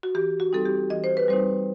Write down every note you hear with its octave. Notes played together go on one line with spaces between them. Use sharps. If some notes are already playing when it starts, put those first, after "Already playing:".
F#4
E3 G4
F#4
G3 C4 D#4 A4
G4
E3 D#5
C5
B4
G3 C4 D#4 C5